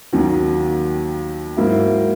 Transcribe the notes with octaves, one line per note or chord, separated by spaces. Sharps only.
D#2 D#3 F#3
G#2 F#3 A#3 E4